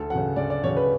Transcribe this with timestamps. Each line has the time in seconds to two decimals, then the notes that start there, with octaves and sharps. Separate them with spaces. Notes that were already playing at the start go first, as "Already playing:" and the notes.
Already playing: D2 A4
0.10 C#3 F#3 F#5
0.36 D2 D5
0.50 D5
0.64 C#3 F#3 C#5
0.77 B4